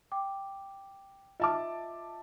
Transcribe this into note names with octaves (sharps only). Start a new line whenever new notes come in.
G5 D6
F4 D#5 E5 A5 D6